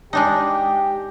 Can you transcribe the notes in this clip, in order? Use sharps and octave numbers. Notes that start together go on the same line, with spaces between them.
G#3 D4 D#4 G4